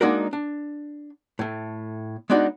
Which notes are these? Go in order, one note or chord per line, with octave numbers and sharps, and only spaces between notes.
G#3 A#3 D4 D#4 F#4 A#4
D4
A2 A3
G#3 B3 D4 D#4 F#4 D5